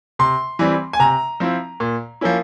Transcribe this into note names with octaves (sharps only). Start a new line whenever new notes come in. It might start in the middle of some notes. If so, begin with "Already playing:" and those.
C3 C6
E3 G3 C4 E4
G#5
C3 A#5
F3 C4 E4
A#2
F3 A#3 C#4 E4